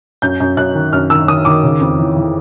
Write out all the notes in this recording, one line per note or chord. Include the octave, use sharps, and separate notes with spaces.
F#2 G6
F#2
F#2 F#6
D#3
F#2 F6
D#3 E6
D#3 D#6
D#3 D6
C#3
F2
E3
E3